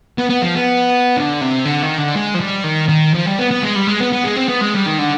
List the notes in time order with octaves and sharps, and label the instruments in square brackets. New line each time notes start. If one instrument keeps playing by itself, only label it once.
[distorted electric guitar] B3
B3
F3
B3
D3
C3
D3
D#3
D3
G#3
F3
G3
D#3
D#3
F3
G3
B3
B3
G#3
G3
G#3
B3
B3
G#3
C4
B3
G#3
G3
D#3
D3